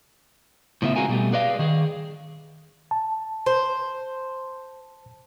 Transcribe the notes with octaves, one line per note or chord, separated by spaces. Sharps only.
A2 C#3 B3 F4 E5
G#3 A#3 C4 F#4 A#4 G#5
B2 G3 A3
G#4 B4 D5 D#5 F5
D#3 G#4
A5
C5